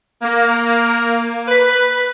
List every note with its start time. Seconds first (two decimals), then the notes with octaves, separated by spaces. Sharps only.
0.22 A#3
1.48 B4